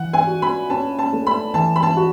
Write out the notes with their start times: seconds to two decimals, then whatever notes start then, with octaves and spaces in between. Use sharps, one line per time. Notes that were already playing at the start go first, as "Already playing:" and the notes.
Already playing: E3 F#5
0.13 G#5
0.27 F#4
0.42 B5
0.70 C#4 A5
0.99 A5
1.13 A3
1.27 B5
1.54 E3 A5
1.76 B5
1.83 A5
1.97 F#4